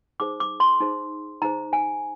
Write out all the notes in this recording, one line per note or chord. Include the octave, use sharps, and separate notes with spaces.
D#4 G#4 C5 D6
D6
C6
D#4 G#4 C5
D#4 G#4 C5 A#5
G#5